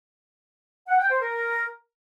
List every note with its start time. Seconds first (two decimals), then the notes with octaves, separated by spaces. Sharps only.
0.88 F#5
0.99 G5
1.10 C5
1.21 A#4